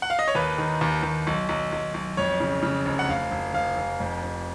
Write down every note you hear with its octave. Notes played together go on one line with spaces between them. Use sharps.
F#5
F5
D#5
C#5
D#2 B4
D#3
D#2
D#2
B1
B1
B1
B1
F2 C#5
C#3
C#3
F1
F#5
F1 F5
F1
F1 F5
F1
F2
F1